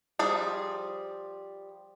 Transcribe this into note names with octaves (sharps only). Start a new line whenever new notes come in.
F3 G3 G#4